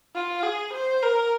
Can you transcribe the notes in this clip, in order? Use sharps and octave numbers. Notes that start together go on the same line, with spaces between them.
F4
G#4
C5
A#4